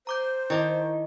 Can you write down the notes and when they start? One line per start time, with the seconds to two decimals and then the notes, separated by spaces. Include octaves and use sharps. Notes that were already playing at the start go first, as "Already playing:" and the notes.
0.07 C5 A#5 D6 G6
0.50 D#3 E4 D#5 D6